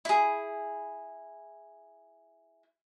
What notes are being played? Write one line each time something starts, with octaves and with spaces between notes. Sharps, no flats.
E4 G#4